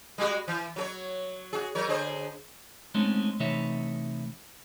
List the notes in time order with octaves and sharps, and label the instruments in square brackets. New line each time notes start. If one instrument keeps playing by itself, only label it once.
[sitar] G3 G#3 F#4
E3
F#3 A4 C#5
F#4 G#4
F#3 A#4 C#5
D3 G#4 C5
[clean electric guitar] G#3 A3 C4 C#4 D#4
C3 E3 A3 D#4 C#5 E5